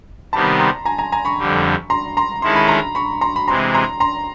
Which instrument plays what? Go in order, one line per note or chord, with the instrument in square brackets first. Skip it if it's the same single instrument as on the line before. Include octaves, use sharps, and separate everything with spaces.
[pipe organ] C3 D#3 G3 B3 [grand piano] A5 B5
[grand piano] A#5 C6
G#5 A#5
G#5 A#5
G#5 A#5
B5 C#6
[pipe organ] F2 D3 G3
[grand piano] A#5 C6
A#5 C6
[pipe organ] D#3 G#3 C#4 E4 A4 [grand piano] C6
[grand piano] B5
A#5 C6
B5 C#6
A#5 C6
B5
[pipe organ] C3 E3 G#3 [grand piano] A#5 C6
[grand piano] A#5 C6
A#5 C6